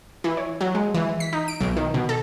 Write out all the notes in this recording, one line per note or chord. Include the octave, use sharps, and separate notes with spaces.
E3
C#5
F#3
G#3
E3
B6
D#4
D7
B1
D#3
B2
A4